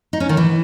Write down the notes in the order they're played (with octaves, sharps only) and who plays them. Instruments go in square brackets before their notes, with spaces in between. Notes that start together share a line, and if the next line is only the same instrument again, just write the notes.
[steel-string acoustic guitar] D#4
C#4
D#3
E3